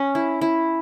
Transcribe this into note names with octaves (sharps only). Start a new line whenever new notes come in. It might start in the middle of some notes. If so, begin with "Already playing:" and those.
Already playing: C#4
E4
E4